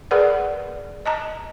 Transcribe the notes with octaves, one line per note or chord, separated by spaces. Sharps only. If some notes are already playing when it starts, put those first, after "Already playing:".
G#4 A#4 B4 D5 F#5
D#5 A5 A#5